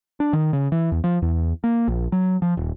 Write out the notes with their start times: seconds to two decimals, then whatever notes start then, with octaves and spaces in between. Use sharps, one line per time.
0.20 D4
0.33 D#3
0.53 C#3
0.72 E3
0.92 E2
1.04 F3
1.22 E2
1.64 A#3
1.88 A#1
2.12 F#3
2.42 F3
2.57 D#1